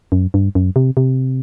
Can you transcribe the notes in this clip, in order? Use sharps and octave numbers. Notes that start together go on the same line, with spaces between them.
F#2
G2
F#2
C3
C3